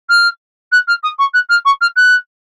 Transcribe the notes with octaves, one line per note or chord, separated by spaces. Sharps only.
F6
F#6
F6
D#6
C#6
F#6
F6
C#6
F6
F#6